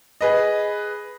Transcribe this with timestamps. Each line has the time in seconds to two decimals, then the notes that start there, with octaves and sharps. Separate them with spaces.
0.21 G#4 B4 D#5